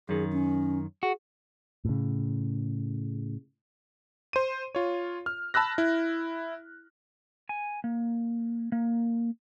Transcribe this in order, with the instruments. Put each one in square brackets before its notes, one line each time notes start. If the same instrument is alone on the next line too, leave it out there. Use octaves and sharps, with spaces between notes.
[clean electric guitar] F#2 D#3 [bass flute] G#4
[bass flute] C#4
[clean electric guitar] F#4 [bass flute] G#4
[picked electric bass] A2 C#3
[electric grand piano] C5 D#7
F4 C#5
F6
A5 B5 E6 F#6 A#6
E4
[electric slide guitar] G#5
A#3
A#3